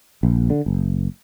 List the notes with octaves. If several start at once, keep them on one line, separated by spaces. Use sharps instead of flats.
A#1
D3
F#1